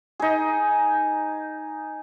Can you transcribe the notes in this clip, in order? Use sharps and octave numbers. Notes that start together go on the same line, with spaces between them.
D#4 G#4